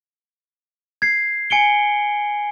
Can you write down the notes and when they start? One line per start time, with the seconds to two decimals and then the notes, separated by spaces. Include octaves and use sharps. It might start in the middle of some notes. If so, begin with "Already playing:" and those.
1.02 G#6 C7
1.50 G#5 C#7 D7 G7